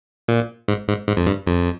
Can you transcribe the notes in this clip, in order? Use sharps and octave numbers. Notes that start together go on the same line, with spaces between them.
A#2
G#2
G#2
G#2
F2
G2
F2